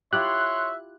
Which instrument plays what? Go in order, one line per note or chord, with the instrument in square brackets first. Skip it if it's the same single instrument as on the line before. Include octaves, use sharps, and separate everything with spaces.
[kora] E4 F4 G4 [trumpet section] C#5 C6 [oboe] E5 [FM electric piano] F#6